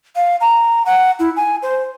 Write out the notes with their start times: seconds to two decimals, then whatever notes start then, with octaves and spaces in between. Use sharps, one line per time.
0.16 F5
0.41 A#5
0.86 F#5
1.19 E4
1.36 G#5
1.62 C5